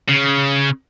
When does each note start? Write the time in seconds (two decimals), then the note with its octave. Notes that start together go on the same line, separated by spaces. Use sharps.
0.08 C#3